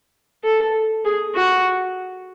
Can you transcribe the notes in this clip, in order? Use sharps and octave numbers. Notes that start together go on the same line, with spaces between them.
A4
G#4
F#4